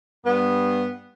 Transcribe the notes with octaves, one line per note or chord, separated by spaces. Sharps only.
G2 B3